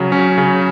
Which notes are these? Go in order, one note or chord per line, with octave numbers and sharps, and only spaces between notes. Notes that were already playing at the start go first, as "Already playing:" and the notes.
Already playing: C#3 F#3
C#4
C#3